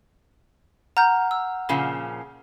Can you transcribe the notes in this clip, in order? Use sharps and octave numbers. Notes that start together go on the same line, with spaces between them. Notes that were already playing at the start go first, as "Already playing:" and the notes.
F#5 A#5 F6 G6
E6
A#2 C#3 F3